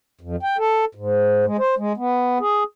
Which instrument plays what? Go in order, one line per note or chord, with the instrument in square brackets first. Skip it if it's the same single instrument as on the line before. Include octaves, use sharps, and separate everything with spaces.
[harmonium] F2
G5
A4
G#2
G#3
C5
G#3
B3
G#4